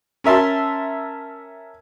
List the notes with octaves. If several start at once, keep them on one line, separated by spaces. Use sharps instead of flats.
C#4 A#4 E5 A5 C6